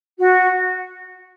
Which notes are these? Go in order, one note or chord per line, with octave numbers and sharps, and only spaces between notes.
F#4